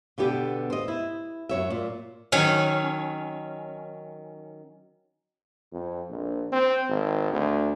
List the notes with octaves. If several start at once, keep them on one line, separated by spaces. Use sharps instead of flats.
B2 D3 B3 G4
C5 D#5
E4
F#2 C#5 E5
A#2
D#3 F#3 C#4
F2
A#1
C4
G#1
D2